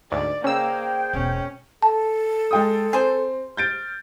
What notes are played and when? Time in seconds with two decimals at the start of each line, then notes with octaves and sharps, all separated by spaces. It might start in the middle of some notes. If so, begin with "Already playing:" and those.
0.12 D2 G#2 D5
0.44 C#3 A#3 G#4 C5 G5 E6
1.13 E1 B2 C#4
1.82 A4 A5
2.51 G#3 G5 D#6
2.93 C4 G#4 C5
3.57 F6 G6 A6 D7